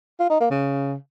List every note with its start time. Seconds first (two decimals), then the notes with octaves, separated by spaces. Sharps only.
0.20 F4
0.30 D#4
0.40 A#3
0.51 C#3